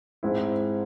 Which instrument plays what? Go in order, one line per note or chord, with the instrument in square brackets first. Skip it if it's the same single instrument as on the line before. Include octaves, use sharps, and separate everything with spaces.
[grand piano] G#2 G#3 C4 E4